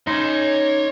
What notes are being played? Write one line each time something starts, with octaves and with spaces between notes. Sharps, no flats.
C#4 D#4 C#5 C6